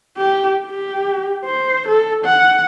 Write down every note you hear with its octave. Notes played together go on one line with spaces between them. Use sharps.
G4
G4
C5
A4
F#5